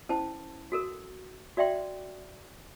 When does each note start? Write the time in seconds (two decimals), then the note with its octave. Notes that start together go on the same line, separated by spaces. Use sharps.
0.09 C#4 E4 C5 A5
0.72 F#4 A4 A#4
1.57 F#4 D5 E5 G5 C6